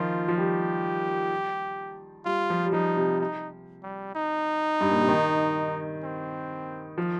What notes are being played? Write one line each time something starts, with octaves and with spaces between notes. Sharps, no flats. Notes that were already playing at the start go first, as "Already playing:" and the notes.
Already playing: D#3 F3 F4
F3
G3 G4
G3 F4
F3
G3
F3 D#4
C3
D#4
G3
D#4
G2
A#2
C3
D#3
C4
F3